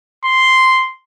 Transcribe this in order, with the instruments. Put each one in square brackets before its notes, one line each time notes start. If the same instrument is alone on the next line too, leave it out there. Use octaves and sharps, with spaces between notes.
[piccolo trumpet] C6